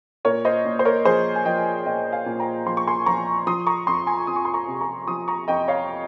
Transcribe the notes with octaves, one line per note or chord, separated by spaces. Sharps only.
A#2 A#4 C#5
C5 D#5
A#2
C5
A#4 C#5
F3 G#4 C5
G#5
F3 D#5 G5
A#2 D#5 G5
F5 G#5
A#2
G5 A#5
F3 C6
C#6
G#5 C6
F3 A#5 C#6
F3 C6 D#6
A#5 C#6
F2 C6 D#6
G#5 C6
F2 D#6
C#6
C6 D#6
A#5 C#6
C3
A#5 C#6
F3 C6 D#6
A#5 C#6
F2 D#5 G5
C#5 F5